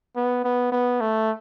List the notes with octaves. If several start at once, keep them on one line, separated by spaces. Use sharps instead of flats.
B3
B3
B3
A3